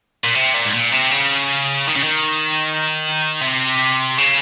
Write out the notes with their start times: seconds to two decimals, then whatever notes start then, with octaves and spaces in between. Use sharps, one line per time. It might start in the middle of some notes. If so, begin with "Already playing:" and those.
0.24 A#2
0.35 C3
0.54 A#2
0.65 G#2
0.73 A#2
0.92 C3
1.11 C#3
1.88 D#3
1.96 C#3
2.03 D#3
3.41 C3
4.18 C#3